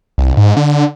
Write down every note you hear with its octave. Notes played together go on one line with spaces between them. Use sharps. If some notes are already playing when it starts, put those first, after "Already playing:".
C2
G#2
D3